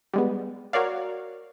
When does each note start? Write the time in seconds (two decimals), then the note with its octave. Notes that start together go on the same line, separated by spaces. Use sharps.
0.14 G3 G#3 B3
0.73 F#4 A#4 C#5 D5 F5